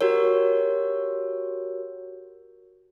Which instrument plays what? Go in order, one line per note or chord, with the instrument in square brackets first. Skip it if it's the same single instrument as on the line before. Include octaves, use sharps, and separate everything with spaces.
[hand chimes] F#4 G4 A#4 C#5